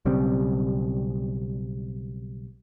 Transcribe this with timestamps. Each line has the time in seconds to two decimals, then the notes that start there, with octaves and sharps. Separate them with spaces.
0.05 B1 C#3 G3 C4